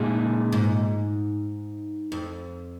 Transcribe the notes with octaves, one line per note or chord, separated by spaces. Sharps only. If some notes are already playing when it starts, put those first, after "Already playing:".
Already playing: A#2 C#3 G#3 D#4 G#4
G#2
F2